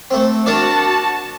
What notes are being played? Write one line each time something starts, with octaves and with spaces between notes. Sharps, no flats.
A3 C4
D4 F#4 A#4 D5 A5